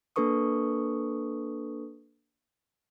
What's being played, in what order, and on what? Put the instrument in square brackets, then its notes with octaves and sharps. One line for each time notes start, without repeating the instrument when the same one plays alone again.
[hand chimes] A#3 D4 A4 B4 C#6 D#6